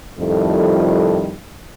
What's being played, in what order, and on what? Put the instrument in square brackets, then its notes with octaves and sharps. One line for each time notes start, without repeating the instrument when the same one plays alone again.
[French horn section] F2 A2 D#3 F3 G3 A3